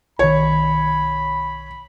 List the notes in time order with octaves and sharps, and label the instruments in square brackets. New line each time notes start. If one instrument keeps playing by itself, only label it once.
[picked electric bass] B1 D#3 [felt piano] C#5 [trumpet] B5